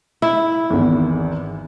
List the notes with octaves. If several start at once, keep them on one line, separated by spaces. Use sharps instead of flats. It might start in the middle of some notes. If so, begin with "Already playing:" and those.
E4
G#1 E2